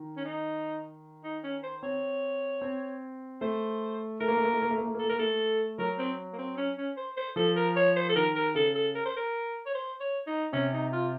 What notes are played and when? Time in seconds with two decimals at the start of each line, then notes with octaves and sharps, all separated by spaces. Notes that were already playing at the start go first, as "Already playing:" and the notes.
Already playing: D#3
0.17 C#4
0.24 D#4
1.24 D#4
1.44 C#4
1.63 C5
1.83 C4 C#5
2.62 C4
3.41 A3 C5
4.20 A3 A#4
4.28 A#3
4.37 A3
4.45 A#3
4.53 A3
4.62 A#3
4.70 A3
4.78 A#3
4.87 A3
4.95 A#3
4.99 A3 A4
5.09 A#3 A#4
5.19 A3 A4
5.78 F#3 A#4
5.98 C4
6.33 A#3
6.38 C4
6.57 C#4
6.77 C#4
6.97 C5
7.17 C5
7.36 F3 A4
7.56 A#4
7.76 C#5
7.96 C5
8.09 A4
8.15 D#3 A#4
8.35 A#4
8.55 C#3 A4
8.75 A4
8.95 A#4
9.05 C5
9.16 A#4
9.66 C#5
9.74 C5
10.00 C#5
10.27 D#4
10.53 C3 C#4
10.73 D#4
10.93 F4